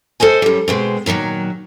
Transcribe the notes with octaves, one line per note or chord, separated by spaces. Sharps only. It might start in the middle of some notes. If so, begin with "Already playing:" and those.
A4 C5 D#5 G#5
F#2 G3
B2 G#3 C4
A#2 D#3 E3 F#3